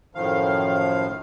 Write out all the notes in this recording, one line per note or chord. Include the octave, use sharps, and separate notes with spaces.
F#2 A2 D#3 F3 F5